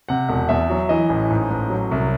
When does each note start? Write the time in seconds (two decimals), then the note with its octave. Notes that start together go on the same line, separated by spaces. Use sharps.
0.09 C3 F#5
0.29 E1
0.49 E2 E5
0.70 F#3
0.89 E3 D#5
1.09 A1
1.30 G#2
1.51 A1
1.70 F#3
1.91 C2